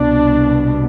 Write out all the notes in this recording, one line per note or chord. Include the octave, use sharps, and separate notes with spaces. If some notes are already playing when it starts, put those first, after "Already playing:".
Already playing: C2 B2 D4